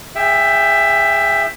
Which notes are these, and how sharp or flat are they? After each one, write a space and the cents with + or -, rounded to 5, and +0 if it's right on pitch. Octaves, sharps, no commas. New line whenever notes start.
G#4 -30 E5 +10 G5 +0